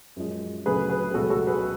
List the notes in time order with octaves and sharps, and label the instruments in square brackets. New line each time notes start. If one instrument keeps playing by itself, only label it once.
[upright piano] F#2 F3 G#3
D2 C#3 F#3 A3 G#4 B4
G#4 B4
C#2 B2 F#3 A3 F#4 A4
F#4 A4
G#4 B4